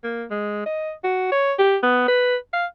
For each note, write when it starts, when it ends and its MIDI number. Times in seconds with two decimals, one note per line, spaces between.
0.04 0.25 58
0.30 0.62 56
0.66 0.92 75
1.04 1.27 66
1.31 1.53 73
1.59 1.77 67
1.83 2.04 59
2.08 2.36 71
2.53 2.66 77